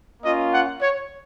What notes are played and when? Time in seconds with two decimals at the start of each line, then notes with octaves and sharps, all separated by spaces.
0.23 A#3 C#4 F4 D#5
0.51 F#5
0.81 C#5